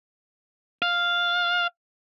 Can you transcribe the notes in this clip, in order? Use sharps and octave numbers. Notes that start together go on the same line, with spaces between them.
F5